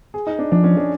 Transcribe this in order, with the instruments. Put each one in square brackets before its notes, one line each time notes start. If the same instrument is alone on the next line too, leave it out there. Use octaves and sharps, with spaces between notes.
[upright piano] G#4
D#4
D4
[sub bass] F3 [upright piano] D4
[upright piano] C#4
D4